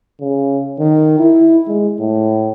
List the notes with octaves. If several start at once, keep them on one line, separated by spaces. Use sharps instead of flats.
C#3
D#3
E4
G#3
A2